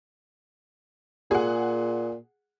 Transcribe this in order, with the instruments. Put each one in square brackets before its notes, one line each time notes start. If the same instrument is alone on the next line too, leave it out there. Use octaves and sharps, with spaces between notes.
[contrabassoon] A#2 [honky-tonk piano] G#4 F#5